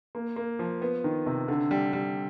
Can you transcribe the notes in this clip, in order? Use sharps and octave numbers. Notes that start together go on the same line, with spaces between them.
A#3
A#3
F3
B3
D#3
C3
D3
G3
G3